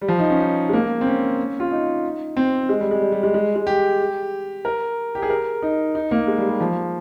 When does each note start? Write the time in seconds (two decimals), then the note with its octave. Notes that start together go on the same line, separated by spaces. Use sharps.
0.01 G3
0.08 F3
0.19 D#4
0.30 C#4
0.40 D#4
0.69 G#3
0.73 A#3
1.01 C4
1.06 C#4
1.60 F4
1.71 D#4
2.37 C4
2.69 G#3
2.80 G3
2.91 G#3
3.02 G3
3.12 G3
3.23 G#3
3.34 G#3
3.56 G#3
3.67 G4
4.65 A#4
5.15 G4
5.22 G#4
5.30 A#4
5.62 D#4
5.95 D#4
6.11 A#3
6.27 G#3
6.38 G3
6.49 G3
6.61 F3